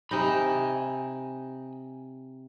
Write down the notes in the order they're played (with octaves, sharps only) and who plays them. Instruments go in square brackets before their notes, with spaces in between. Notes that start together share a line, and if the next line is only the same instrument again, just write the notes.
[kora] C3 D#4 [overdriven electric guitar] G#5 B5